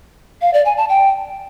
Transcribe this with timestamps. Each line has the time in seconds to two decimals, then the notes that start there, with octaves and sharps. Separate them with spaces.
0.42 F5
0.53 D5
0.65 G#5
0.77 A5
0.89 G5